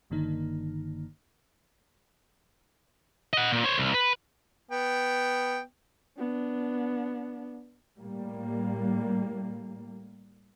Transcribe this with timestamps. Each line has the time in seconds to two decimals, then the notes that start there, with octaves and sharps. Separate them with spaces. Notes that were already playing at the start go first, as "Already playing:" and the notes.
0.10 G1 G2 D3 D#3 A#3 D#4
3.33 D#5 F#5
3.52 A#2
3.64 C5 C#5
3.78 C2
3.94 B4
4.71 B3 G5
6.18 B3 D4
7.98 A2 G3 A#3